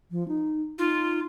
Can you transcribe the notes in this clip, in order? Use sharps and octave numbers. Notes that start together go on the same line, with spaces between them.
F3
D#4
D#4 F4